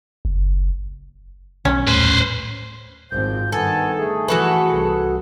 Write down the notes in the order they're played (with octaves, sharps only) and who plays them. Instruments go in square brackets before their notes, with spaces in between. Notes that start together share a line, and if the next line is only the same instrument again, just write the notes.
[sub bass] F#1
[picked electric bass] B1 [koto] C#4
[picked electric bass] D#1 A2 [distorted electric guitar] B4 C5
[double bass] G#1 C4 [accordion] F3 G6
[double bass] G2 D#3 [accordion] B3 G#5 A5 [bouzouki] A4
[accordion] A3 G#4
[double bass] E3 [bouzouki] F#4 A4 B4
[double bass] C2